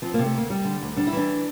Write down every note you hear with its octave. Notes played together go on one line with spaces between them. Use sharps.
F3 C4
C3 A#3
A3
D2 A#3
G3
D3
D2
G3 D4
E4
E3 D4